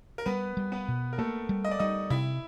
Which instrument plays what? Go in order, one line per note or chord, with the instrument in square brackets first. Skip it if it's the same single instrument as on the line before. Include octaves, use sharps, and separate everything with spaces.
[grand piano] A#4
[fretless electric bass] G3 [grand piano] B3 B4
[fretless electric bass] G3
[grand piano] B3 B4
[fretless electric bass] B2
[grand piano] A#4
[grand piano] A3 A4 [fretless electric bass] A#3
[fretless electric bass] G3
[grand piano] D#5
D5
[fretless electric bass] G3 [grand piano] D#4 D#5
[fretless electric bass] C3 [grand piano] E4 E5